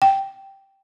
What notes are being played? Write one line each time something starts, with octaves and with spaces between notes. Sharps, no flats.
G5